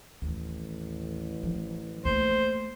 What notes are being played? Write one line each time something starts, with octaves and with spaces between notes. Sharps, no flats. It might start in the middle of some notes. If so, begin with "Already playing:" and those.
A1 D#2
F3
A3 A#3 C5